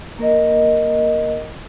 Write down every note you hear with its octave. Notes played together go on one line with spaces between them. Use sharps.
A#3 A#4 D#5